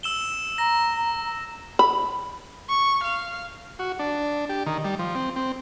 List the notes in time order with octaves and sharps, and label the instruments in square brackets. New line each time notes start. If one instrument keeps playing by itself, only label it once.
[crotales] E6 E7 G7
[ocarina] A#5 [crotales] A#6
[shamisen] B5
[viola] C#6
F5
[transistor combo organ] F#4
D4
G4
D#3
G3
F3
C4
C4